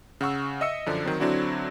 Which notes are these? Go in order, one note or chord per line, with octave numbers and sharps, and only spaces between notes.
C#3 F#5 C#6 E6
D#5 E5 E6 C#7
F#2 D3 F3 D4
D#3 F#3 C4
D3 F#3 C4 D4 E4 F#4